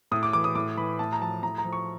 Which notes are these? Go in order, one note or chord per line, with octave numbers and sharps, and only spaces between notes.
A2 D#6
D6
E3 D6
D#6
A2 D6
E3 B5
A2 A5
A#5
F3 A5
A2 A#5
A#5
F3
C#6